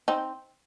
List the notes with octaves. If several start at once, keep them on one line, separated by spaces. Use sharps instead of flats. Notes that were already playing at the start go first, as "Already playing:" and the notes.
C4 D#4